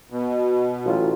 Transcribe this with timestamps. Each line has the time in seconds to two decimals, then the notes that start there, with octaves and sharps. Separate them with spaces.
0.10 B2
0.85 A1 F#3 F4